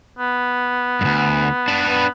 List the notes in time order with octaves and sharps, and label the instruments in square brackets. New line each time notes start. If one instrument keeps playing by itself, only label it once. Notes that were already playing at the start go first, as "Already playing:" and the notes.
[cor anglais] B3
[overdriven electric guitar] D2 G2
D4 B4
[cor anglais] B3